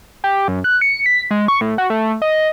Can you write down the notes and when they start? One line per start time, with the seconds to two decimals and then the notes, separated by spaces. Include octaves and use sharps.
0.24 G4
0.48 F#2
0.64 F#6
0.81 C#7
1.06 B6
1.31 G#3
1.48 C#6
1.61 A2
1.78 F#4
1.90 A3
2.22 D#5